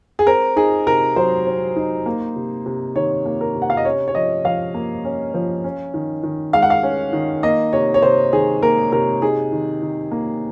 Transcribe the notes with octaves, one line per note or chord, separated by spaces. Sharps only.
G#4
C4 A#4
D#4 G#4
C3 A#4
F#3 C5
C4
D#4
A#3
C3
C3
D#3 C#5
A#3
A#4
C3
F#5
F5
D#5
C#4 C#5
C#5
F3 D#5
F3 F5
A#3
C#4
F3
C#4
D#3
D#3
G#3 F5
F#5
F5
C#4
D#3
A#3 D#5
C3 C#5
C#5
C3 C5
D#3 G#4
A#3 A#4
C3 A#4
D#4 G#4
D#3
D#3
A#3